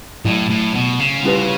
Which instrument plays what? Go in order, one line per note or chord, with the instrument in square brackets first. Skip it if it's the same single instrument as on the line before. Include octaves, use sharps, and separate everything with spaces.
[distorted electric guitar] A2 [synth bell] F#3 A3 E4
[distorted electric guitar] A2
B2
C#3
[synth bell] G3 C#4 E4 G4 B4